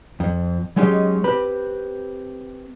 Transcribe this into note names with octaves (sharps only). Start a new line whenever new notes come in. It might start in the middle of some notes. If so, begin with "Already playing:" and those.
F2
F#3 G#3 C#4 D#4 G4
C4 G4 B4 B5